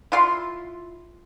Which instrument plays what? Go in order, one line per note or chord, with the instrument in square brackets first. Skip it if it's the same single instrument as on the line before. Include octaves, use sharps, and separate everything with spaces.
[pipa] E4 F4 C6